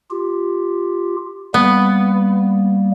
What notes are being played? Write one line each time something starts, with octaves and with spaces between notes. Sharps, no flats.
F4 G4
G3 A#3 B3